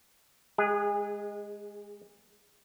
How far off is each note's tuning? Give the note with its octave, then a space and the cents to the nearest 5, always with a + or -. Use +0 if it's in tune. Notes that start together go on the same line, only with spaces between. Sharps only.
G#3 +0 G#4 -30